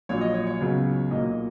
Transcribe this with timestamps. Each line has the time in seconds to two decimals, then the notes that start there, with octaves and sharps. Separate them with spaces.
0.09 A#1 A#2 F#3 C#5
0.21 D#5
0.34 C#5
0.47 C#5
0.60 C#2 C#3 F#3 B3
1.10 B1 A#2 F#3 A#3 D#5